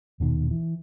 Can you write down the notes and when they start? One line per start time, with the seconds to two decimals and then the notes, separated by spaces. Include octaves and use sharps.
0.20 D#1 B2 D#3
0.51 E3